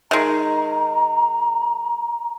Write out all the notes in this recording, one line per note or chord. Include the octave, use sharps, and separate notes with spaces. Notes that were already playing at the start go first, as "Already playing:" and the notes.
D#3 G#3 A#5